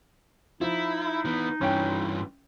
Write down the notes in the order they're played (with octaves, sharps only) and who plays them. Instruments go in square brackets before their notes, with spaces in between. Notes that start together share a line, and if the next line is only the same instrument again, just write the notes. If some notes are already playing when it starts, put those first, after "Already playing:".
[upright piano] F3 [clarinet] D#4 [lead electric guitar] E4
[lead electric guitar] E3 B3
[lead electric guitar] G2 E3 [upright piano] C#4 G5